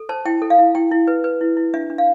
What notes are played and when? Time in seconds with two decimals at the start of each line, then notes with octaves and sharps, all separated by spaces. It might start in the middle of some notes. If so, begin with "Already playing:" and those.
Already playing: A4
0.09 C5 A5
0.25 E4 G5
0.42 A4
0.50 F5
0.58 E4
0.75 E4 G5
0.92 E4
1.07 B4
1.24 B4
1.41 E4
1.57 E4
1.74 D4 E5
1.90 D4
1.98 F5